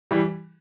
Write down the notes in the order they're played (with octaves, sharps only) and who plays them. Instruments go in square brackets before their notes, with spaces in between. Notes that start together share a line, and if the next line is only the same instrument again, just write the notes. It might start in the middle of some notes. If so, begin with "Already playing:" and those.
[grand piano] E3 G3